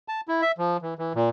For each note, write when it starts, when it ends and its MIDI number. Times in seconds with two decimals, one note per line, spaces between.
0.08 0.21 81
0.28 0.42 64
0.42 0.52 76
0.58 0.77 53
0.82 0.94 52
0.99 1.13 52
1.15 1.29 46